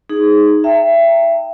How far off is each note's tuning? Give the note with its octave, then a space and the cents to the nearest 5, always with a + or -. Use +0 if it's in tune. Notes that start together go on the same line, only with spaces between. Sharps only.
D#4 +0 G#4 +0
E5 +25 G5 +0 A#5 -35